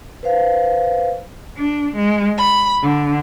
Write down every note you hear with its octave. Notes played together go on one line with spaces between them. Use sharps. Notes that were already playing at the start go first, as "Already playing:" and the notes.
B4 C5 F5
D4
G#3
B5
D3